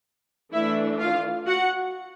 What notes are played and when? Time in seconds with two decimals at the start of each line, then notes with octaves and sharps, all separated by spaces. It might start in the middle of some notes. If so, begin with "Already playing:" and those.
0.53 E3 A3 D4 E4 E5
1.00 F4 F5
1.47 F#4 F#5